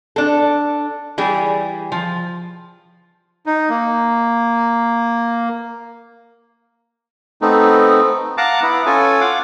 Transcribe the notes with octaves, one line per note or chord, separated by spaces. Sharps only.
D4 A4
E3 G3 G#4
F3
D#4
A#3
A3 B3 C4 D#4
F5 F#5 A5 A#5 D6
B3 E4 F#5
C#4 F4 A4 G#5
F5 F#5 D6